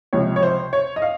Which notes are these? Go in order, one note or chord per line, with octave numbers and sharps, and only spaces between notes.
C#2 C3 F3 C#5
C#5
C5
C#5
D#5
F5